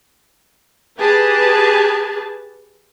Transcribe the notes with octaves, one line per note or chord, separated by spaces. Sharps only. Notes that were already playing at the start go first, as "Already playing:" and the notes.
G4 G#4 B4 A5